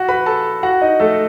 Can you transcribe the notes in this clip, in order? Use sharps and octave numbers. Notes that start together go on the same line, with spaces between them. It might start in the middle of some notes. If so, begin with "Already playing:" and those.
Already playing: F#4 F#5
B4 B5
A4 A5
F#4 F#5
D#4 D#5
A3 A4